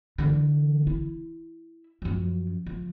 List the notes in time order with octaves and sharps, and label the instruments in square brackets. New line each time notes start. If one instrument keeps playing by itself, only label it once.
[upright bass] D3 E3
E4
F#2 F3
F3